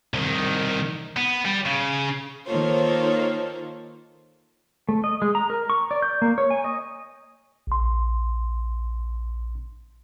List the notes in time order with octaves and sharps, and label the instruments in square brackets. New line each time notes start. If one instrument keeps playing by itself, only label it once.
[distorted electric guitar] C2 D#3
B3
G3
C#3
[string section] D#3 A#3 F4 A4 C5 C#5
[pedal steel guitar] A3
D#5
G#3
A#5
A#4
C#6
D5
G6
A#3
C#5
G#5
D#5
[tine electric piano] A#1 C6